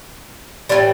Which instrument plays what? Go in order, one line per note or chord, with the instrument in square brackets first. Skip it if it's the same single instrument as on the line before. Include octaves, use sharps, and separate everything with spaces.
[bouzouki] A2 E3 G3